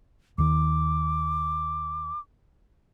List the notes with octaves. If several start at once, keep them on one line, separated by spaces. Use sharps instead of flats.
D#2 D#3 D6